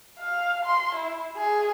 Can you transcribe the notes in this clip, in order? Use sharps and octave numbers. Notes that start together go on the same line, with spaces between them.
F5
C6
E4
G#4